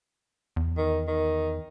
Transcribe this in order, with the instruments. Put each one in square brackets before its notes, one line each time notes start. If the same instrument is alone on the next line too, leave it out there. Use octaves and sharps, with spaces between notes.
[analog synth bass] E2
[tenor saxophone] D#3
D#3